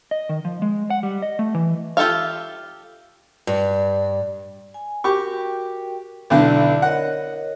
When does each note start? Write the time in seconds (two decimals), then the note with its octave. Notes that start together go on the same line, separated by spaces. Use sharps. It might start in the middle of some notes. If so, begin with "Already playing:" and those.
0.11 D#5
0.29 D#3
0.45 F3
0.62 G#3
0.90 F#5
1.03 G3
1.22 D#5
1.39 A3
1.55 E3
1.97 F4 G4 A4 E5 F5
3.47 G2
4.74 G#5
5.04 F#4 G4 A#4 G5 C#6
6.30 B1 D3 E4 D5
6.82 A#4 C#5 D#5 F#5